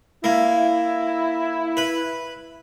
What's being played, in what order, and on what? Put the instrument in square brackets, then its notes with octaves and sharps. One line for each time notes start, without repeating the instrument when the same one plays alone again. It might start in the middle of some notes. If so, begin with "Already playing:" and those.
[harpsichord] A#3 [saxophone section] E4
[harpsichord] B4